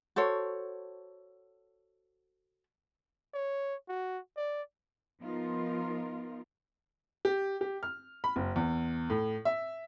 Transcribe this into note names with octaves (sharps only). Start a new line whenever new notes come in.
F#4 A4 C5 C#5
C#5
F#4
D5
F3 B3 D#4 F4 A#4
G4
G4
F6
B5
F#1
E2
A2
E5